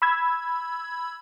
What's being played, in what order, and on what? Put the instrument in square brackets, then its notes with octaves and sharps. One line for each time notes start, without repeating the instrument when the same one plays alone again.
[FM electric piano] B5 E6 G#6